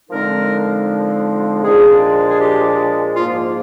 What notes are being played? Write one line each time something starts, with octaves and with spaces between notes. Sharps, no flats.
D3 F3 G#3 C4 D#4 A#4
A#2 F3 G#3 D4 G#4
G#4
G4
G#2 F3 A#3 F4